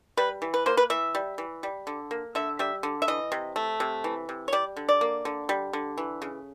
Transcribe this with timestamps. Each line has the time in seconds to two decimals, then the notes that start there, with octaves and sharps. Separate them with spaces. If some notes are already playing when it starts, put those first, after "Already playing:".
0.17 G3 B4
0.42 E3
0.54 B4
0.66 A#3 C5
0.77 B4
0.90 E3 E5
1.15 G3
1.38 E3
1.63 G3
1.87 D3
2.11 A#3
2.35 D3 E5
2.59 G3 E5
2.83 D3
3.02 E5
3.08 E3 D#5
3.32 C3
3.56 A3
3.80 C3
4.04 E3
4.29 C3
4.48 C#5
4.53 G3 D5
4.76 D3
4.89 D5
5.01 A#3
5.25 D3
5.49 G3
5.73 D3
5.98 E3
6.22 C#3